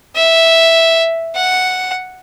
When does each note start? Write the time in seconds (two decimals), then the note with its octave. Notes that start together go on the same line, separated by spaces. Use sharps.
0.16 E5
1.36 F#5